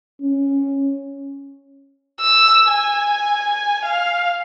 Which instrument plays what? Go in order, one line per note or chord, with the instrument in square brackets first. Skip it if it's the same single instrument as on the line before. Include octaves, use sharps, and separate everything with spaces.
[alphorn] C#4
[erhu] E6
G#5
F5